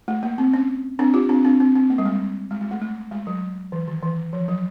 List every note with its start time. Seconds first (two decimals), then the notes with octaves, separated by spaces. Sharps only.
0.08 A3
0.23 A#3
0.38 C4
0.54 C#4
0.99 C4 D4
1.14 F4 G4
1.29 C4 D4
1.45 C4 D4
1.60 C4
1.75 C4
1.90 A#3
1.98 G3
2.05 G#3
2.51 G#3
2.61 G#3
2.71 A3
2.82 A3
3.12 G#3
3.27 F#3
3.72 E3
3.88 D#3
4.03 E3
4.33 F3
4.48 F#3